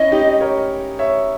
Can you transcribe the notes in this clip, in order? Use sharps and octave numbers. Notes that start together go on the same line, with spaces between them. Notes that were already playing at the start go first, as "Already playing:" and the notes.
Already playing: C#4 E4 D#5
D#4 G4
A#4 C#5
C#5 E5